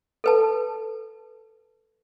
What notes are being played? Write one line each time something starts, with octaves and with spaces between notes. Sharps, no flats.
A4 B4 A5